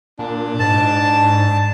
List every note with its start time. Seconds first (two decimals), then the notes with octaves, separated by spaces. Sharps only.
0.19 A#2 D4
0.59 G#2 A5